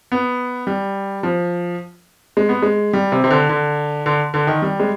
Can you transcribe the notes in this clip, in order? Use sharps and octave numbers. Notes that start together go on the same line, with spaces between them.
B3
G3
F3
G#3
B3
G#3
G3
C3
C3
D3
D3
D3
D3
D#3
G3
G#3